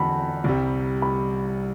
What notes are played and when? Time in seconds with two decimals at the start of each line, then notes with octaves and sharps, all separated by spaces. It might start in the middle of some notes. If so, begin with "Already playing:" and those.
Already playing: E2 D3 F#3 A5 B5
0.44 C2 C3 G3
1.02 B5